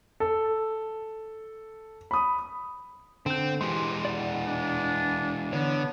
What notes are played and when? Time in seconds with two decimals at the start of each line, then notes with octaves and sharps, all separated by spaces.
0.20 A4
2.11 B5 D#6
3.26 D3 C4 G6
3.61 E3 G#3 G4 C6
4.05 D5 F#5
4.47 D4
5.53 D3 B3 C#5